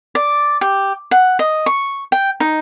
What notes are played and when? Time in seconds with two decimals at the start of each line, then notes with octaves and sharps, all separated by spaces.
0.15 D5
0.61 G4
1.11 F#5
1.39 D#5
1.66 C#6
2.12 G5
2.40 D#4